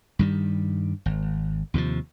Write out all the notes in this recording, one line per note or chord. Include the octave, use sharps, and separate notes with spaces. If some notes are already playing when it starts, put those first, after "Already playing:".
G2 D#3 G3
G#1
D#2 C3 E3 F3